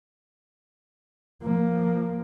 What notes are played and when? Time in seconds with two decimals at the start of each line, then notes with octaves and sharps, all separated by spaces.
1.42 F3 A#3